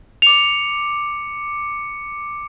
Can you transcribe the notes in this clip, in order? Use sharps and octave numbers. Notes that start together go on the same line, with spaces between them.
D6 C#7 F7